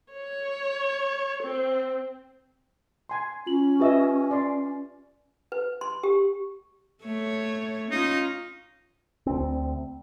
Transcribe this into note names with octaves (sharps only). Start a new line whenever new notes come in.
C#5
C4
G#5 C6
C#4 F4 F#7
F4 G4 B4 D#5 E5 E6
D5 C6
B4
C6
G4
A3 C#5
C#4 D#4 F4
D2 C4